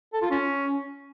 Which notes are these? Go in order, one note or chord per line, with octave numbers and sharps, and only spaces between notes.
A4
F4
C#4